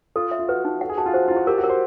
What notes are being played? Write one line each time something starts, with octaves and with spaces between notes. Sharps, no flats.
F4 A4
E5
F4
F#4 B4
D#4
A4 F#5
G#4
F#4 A5
F4
F#4 C5
E4 F4
F#4
G4 A#4
F#4
A#4
C5